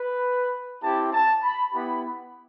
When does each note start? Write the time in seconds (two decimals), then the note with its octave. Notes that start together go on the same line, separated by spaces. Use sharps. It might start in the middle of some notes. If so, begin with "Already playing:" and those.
Already playing: B4
0.82 C4 E4 G4 A5
1.13 A5
1.43 B5
1.73 B3 E4 G4 B5